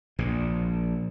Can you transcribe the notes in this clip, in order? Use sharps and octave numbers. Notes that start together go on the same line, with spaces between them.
A#1 A#2